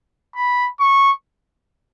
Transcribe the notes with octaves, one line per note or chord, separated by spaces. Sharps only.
B5
C#6